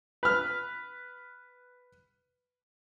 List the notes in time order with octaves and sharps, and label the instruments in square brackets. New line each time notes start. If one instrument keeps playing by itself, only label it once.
[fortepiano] B4 F6